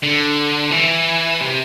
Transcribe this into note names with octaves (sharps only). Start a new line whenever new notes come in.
D3
E3
C3